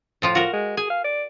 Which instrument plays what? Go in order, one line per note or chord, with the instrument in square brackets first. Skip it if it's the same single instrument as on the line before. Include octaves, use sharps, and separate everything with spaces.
[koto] A2 F3 F4
[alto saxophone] F4 [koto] F#4 A#4
[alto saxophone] G#3
[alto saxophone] G#4 [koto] G#5
[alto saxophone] F5
D5